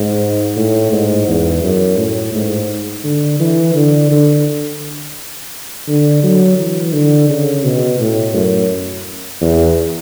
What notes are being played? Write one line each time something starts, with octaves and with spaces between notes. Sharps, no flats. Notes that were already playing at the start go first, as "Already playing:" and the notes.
Already playing: G#2
A2
G#2
E2
F#2
A2
G#2
D3
E3
D3
D3
D3
F#3
E3
D3
C#3
B2
A2
F#2
E2